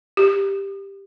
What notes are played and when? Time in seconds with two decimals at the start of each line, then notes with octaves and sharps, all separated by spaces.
0.17 G4